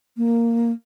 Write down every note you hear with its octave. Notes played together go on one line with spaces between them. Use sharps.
A#3